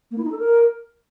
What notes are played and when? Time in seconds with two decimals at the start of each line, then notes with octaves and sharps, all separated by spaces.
0.11 A#3
0.18 E4
0.24 D#4
0.31 A4
0.38 A#4